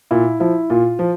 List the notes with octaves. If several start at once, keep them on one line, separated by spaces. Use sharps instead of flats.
A#2 E4
F3 E4
A#2 F4
F3